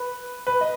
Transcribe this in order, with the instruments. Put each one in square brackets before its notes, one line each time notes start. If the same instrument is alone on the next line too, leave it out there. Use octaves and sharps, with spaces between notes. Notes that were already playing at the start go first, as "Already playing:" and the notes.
Already playing: [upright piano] B4
B4
D#5